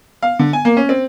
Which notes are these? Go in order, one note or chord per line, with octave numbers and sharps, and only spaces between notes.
F5
D3
G#5
A#3
C#4
C4